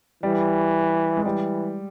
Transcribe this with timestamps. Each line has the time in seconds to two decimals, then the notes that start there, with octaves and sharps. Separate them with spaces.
0.23 E3 G3
1.17 G#3
1.25 E3 G3